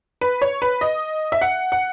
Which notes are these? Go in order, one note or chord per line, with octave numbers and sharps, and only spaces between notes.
B4
C#5
B4
D#5
E5
F#5
F#5